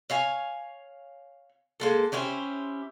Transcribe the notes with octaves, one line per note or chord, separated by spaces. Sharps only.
C#5 F5 G#5
G#3 A#3 A4
C#4 E4 G4 C5